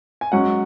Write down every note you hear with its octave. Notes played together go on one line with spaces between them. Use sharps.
G#5
G#2 F#3 C#4 F#5